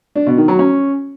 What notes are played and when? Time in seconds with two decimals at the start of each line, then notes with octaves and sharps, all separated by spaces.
0.16 D4
0.26 B2
0.37 D#3
0.48 F#3
0.59 C#4